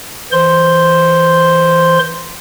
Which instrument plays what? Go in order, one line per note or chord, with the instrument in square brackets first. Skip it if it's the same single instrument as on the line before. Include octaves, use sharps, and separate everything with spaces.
[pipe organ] E3 C5 C6